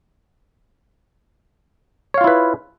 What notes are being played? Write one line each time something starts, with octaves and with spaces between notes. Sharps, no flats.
E4 F4 B4 C#5 F5